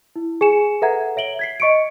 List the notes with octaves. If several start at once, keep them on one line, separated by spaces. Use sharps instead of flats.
E4
G#4 G#5 C#7 E7
A4 B4 E5 F#5 A#5 G#6
C#5 E5 D7 F#7 G7
G#6 B6 C7
D#5 C#6 C#7 D7